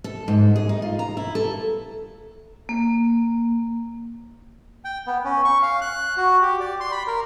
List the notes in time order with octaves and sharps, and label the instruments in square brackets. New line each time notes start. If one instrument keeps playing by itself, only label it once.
[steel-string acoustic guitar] A4
G#2
G#4
D#4
F4
A#5
E4
A4
[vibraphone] A#3
[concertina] G5
B3
C#4
C#6
F5
F#6
F#4
G4
D5
C6
B5
A#4